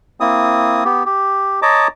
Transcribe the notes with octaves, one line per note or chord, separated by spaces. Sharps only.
A#3 C4 E4 D#6
B3 G4
G4
C#5 D#5 A5 A#5 D6